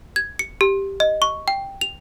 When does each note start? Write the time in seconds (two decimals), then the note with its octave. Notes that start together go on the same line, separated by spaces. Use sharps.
0.16 G#6
0.39 C#7
0.61 G4
1.00 D#5
1.22 C#6
1.48 G5
1.81 F7